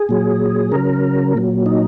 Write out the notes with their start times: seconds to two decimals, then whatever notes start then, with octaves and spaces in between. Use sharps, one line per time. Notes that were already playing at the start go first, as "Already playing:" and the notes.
Already playing: G#4
0.09 A#2 F#3
0.72 C#3 F#3 A#4
1.34 A#2 F#3
1.66 D#4